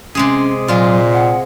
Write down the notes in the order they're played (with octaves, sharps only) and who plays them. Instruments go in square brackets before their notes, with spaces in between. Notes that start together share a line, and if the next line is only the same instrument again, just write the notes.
[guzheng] C3 G#3 G#4 [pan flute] C#4
[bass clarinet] A#2 [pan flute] F#3 [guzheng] G#3 F4
[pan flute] F#5